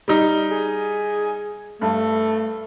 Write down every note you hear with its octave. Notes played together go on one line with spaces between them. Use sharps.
G3 D#4
G#4
G2 A3